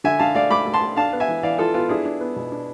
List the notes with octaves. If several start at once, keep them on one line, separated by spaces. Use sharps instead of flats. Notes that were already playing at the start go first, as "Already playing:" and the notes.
D3 E5 G#5
D3 F5 A5
A3 D5 F5
A3 B5 D6
A3
A5 C6
A3
D4 F5 A5
B3
E5 G#5
E3
E3 D5 F5
E3 F4 A4
B3 F4
D4 E4 G#4
D4
B3
B2
D4